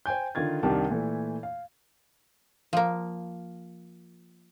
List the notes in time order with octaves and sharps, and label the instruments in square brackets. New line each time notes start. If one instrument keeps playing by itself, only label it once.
[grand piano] C5 G5 G#5 G6
D3 D#3 F4 G#6 A6
C2 D#3 G3 D4 G4 A5
A#2 E3 A3
F5
[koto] F3 A#3